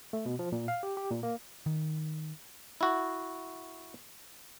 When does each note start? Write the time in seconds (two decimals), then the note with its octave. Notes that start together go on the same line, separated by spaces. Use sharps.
0.13 A3
0.26 B2
0.39 F3
0.52 A#2
0.68 F5
0.83 G4
0.97 G4
1.11 A#2
1.23 A#3
1.66 D#3
2.81 E4 F#4